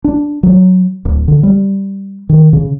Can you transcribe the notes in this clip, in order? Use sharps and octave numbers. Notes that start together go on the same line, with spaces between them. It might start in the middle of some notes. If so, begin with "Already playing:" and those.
D4
F#3
D1
D3
G3
D#3
C#3